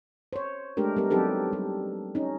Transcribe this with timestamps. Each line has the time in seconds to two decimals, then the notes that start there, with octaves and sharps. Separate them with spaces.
0.33 C5 C#5
0.77 G#3 A3 D4 G4 A#4
0.96 G3 B3 A#4
1.11 F#3 C4 D#4 G4 A4 B4
1.53 G3
2.15 C#4 D#4